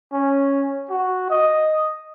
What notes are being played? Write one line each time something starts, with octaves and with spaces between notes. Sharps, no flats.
C#4
F#4
D#5